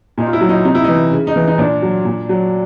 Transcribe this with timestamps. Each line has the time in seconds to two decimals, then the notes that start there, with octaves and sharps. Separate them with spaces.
0.18 A#2 D#4
0.27 F4
0.33 E4
0.41 F#3
0.49 D#4
0.65 C3 D#4
0.75 E4
0.84 E3 D#4
1.12 C#3
1.27 D#4
1.36 E3
1.48 D#4
1.58 A#2 D4
1.82 F#3
2.05 A#2
2.29 F#3